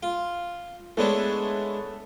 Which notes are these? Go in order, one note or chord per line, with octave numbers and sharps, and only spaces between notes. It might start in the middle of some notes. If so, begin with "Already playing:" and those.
F4
E3 G#3 A3 B3 D4 C#5